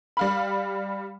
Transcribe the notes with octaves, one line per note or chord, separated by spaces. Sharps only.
G3 F5 B5